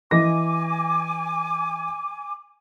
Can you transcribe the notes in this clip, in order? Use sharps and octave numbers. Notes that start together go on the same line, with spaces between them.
E3 D#5 G#5 D6 A#6